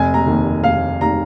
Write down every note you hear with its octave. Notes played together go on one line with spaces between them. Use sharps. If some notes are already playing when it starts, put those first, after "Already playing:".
Already playing: F1 G#5
A#5
D#2 D#3
F1 F5
D#3 A#5